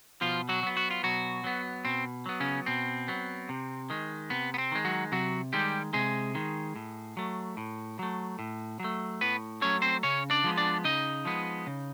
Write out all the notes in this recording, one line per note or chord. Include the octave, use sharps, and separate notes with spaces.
B2 F3 F4
F#3 F#4
F#3 B3
F#4
F4
B2 F#3 F#4
F#3 B3
B2 C4
F#3 B3
C#3 C#4
B2 C4
F#3 B3
C3
D#3 G#3
C3 B3
B3
C4
D#3 G#3
F#3 F#4
C3 F#3 F#4
D#3 G3 G#3 G4
C3 G#3 G#4
D#3 G#3
A2
F#3 A3
A2
F#3 A3
A2
F#3 A3
A2 B3 B4
F#3 A3 C#4 C#5
C4 C5
C#3 C#4 C#5
D4 D5
F3 G#3 B3
D4 D5
C#3 D#4 D#5
F3 G#3 B3
C#3